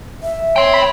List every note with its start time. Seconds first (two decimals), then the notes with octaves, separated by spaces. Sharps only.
0.23 E5
0.56 C#5 G5 C6
0.74 B5